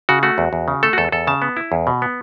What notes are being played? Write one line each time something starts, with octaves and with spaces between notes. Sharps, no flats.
C#3 F#4
A3 F#4
E2
E2
C#3
A3 A4
F#4
E2 A4
E2 A4
C#3 A5
B3
E4
E2
B2
B3